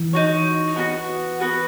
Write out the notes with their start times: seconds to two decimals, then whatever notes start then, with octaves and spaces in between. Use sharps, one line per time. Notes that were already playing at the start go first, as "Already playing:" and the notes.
Already playing: E3
0.13 D#4 F#4 C#5
0.76 B3 D#4 F#4
1.40 B3 F#4 B4